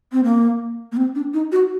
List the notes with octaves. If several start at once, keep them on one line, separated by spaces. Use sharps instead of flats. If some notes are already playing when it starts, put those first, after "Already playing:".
C4
A#3
A#3
C4
D4
D#4
F#4